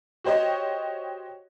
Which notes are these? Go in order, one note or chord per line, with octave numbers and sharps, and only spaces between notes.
F#4 G4 C5 C#5 D#5